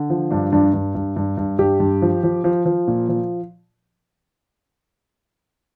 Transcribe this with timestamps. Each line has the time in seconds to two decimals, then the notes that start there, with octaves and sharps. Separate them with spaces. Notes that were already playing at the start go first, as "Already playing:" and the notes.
Already playing: D3
0.10 F3
0.31 G2 D4
0.52 G2 D4
0.74 G2
0.95 G2
1.16 G2
1.37 G2
1.59 G2 G4
1.80 G2
2.02 F3
2.23 F3
2.44 F3
2.66 F3
2.88 A#2
3.09 F3